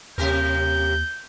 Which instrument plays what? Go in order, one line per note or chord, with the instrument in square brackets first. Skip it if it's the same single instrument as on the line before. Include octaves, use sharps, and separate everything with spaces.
[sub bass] D#2 [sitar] C3 G4 A#4 [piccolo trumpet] G6